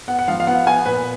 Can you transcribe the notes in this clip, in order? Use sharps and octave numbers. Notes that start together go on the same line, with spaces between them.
B3 F#5
F#5
F3 F5
F5
B3 F#5
B3 G#5
A#2 B4